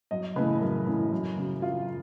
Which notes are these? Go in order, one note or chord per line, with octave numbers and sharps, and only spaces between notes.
F#2 D#5
C#3 E3 A3 B4
F#2 A#4
C#3 E3 A3
F#2
C#3 F#3
F#2 F4